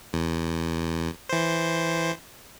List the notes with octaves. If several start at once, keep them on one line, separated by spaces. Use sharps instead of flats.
E2
E3 C5